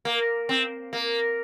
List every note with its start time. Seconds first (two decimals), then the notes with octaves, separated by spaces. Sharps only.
0.05 A#3
0.49 C4
0.93 A#3